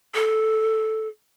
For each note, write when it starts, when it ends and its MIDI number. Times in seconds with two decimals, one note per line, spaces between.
0.15 1.08 69